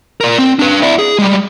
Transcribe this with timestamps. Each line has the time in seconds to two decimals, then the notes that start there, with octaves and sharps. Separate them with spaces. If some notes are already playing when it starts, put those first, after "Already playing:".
0.21 A#4 D5
0.39 C4
0.59 D4 B4
0.82 E4 D5
0.99 G#4
1.19 G3 G#3